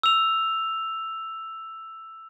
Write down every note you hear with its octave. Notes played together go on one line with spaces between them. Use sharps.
E6 F7